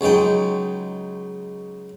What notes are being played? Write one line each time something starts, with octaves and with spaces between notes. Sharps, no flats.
C#2 F#3 G#3 D#4 G5